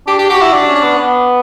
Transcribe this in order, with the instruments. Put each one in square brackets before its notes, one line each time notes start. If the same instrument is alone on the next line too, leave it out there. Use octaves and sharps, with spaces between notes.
[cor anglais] D4 [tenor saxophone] G4
[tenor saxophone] G4
[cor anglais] F#4 [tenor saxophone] G4
[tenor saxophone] E4
D4
[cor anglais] C#4
[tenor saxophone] D4
[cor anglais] B3
B3